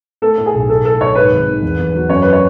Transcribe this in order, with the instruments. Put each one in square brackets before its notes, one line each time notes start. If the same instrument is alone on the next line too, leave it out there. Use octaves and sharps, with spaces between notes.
[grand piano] A3 [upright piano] A4
[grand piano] A2
[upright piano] G#4
[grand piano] B1
[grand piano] B1 [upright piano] A4
[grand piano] A2 [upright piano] A4
[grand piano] B1 [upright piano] C#5
[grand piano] G#2 [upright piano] B4
[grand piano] G#1
D#3
E2
E2
F#3
[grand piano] F#2 [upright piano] C#5
[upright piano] B4
C#5